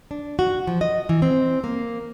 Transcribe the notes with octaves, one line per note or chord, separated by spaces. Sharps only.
D4
F#4
F3
D#5
E3
C4
A#3